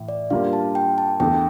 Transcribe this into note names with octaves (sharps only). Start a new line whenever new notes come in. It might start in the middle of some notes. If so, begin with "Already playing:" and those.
Already playing: A2 E3
D5
D3 G3 A#3 F4 F5
A5
G5
A5
E2 D3 A3 G5